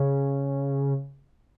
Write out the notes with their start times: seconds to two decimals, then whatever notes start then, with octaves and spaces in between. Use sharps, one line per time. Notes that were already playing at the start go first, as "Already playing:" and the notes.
Already playing: C#3